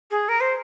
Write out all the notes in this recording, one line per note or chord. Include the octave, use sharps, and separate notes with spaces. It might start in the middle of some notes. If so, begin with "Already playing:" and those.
G#4
A#4
C5